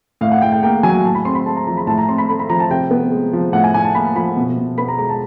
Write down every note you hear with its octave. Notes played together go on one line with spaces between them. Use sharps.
A2 F5
F#5
A2 G5
G5
A#3 G5
F#3 G#5
A2 A5
B5
C4 C6
B5
G#3 A5
A#5
F3 A#5
B5
A2 A5
A#5
C4 C6
B5
A3 B5
B5
F3 A#5
A5
C3 G5
B3
G#3
F3
A2 F#5
G#5
A2 G#5
A5
A#3 B5
F3 B5
B2
B2
B3 B5
A#5
G#3 A#5
A5